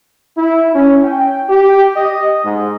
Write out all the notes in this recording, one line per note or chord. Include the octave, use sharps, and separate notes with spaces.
E4
C#4
G5
G4
D#5
G#2